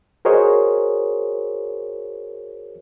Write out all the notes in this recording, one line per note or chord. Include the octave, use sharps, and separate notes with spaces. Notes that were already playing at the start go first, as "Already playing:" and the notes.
F#4 G#4 A#4 C5 C#5 D#5